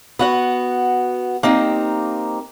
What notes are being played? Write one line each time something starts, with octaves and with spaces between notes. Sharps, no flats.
B3 F#4 F#5
A#3 C4 D#4 G4